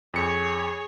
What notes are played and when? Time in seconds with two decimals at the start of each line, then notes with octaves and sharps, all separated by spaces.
0.14 F2 G#4 C#5 C#7